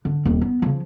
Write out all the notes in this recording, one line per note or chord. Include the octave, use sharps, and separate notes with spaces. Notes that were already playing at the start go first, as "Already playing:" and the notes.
D3
D#1 C4
B3
C#3 F3